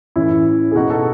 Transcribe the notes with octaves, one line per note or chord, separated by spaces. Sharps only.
A2 E3 C#4 E4
G#4
B2 D#4 F#4
F#4 A4